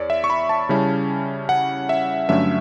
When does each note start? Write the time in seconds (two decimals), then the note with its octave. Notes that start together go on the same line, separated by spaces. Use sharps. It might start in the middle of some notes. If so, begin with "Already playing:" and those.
Already playing: E2 C#5 D5
0.10 E5
0.24 C#6
0.30 B5
0.49 A5
0.69 C#3 G3 C#4 E4
1.49 F#5
1.89 E5
2.29 G2 D3 F#3 A3 C#4 E5